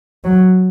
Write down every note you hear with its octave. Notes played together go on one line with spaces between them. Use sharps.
F#3